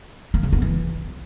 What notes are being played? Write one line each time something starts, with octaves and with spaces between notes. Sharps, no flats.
A#3
C#3
B3
E3